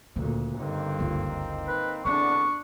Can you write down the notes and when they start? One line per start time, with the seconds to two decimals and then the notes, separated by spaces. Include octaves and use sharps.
0.16 D2 A#2 C#3
0.58 G2 D3 A#3 C4 D#4
0.99 F#1 C#2
1.67 B4
2.05 E2 D3 C4 D4 C#6